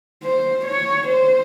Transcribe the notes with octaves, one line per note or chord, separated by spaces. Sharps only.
C5
C#5
C5